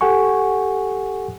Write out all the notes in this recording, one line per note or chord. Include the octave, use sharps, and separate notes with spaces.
G4 A4 F#5 G#5 C#6